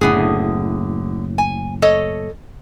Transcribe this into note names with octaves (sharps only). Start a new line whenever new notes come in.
F#1 A2 D3 B3 G#4
G#5
A4 C#5 D#5